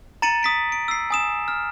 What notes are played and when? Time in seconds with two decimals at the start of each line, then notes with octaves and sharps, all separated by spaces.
0.22 A#5 A6 C#7 D#7 F#7
0.43 D#6 B6 D7
0.72 D7
0.88 E6 C7
1.10 G#5 D#6 E7
1.48 F6